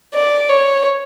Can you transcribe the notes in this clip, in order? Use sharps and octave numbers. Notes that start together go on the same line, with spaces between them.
D5
C#5